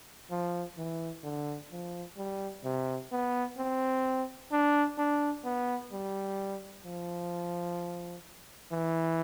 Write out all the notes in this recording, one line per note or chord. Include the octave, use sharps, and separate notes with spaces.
F3
E3
D3
F3
G3
C3
B3
C4
D4
D4
B3
G3
F3
E3